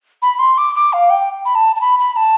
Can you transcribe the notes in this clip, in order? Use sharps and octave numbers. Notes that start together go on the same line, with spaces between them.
B5
C6
D6
D6
F5
G5
B5
A5
A5
B5
B5
A5